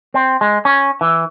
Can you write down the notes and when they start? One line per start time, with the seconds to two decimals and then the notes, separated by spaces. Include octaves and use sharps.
0.14 C4
0.41 G#3
0.65 C#4
1.01 E3